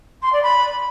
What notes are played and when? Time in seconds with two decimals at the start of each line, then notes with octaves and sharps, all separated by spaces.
0.22 C6
0.32 D5
0.42 B5